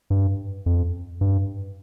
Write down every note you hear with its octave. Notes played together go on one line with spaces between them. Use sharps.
G2
F2
G2